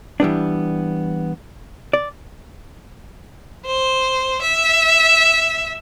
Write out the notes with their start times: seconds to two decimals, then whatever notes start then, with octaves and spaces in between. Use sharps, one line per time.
0.20 E3 G3 B3 D4
1.93 D5
3.66 C5
4.42 E5